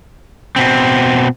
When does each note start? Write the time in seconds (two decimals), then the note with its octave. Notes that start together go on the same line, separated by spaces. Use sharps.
0.56 B2 C4